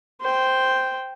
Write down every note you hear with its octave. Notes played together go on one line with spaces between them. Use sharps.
C5 G5